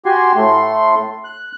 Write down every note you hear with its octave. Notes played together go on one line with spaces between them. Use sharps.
F#4 G4 G#5 C6
A2 A3 C6
F#6